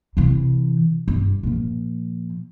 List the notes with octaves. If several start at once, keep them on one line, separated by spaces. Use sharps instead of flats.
C3 E3
G2
A#2 F3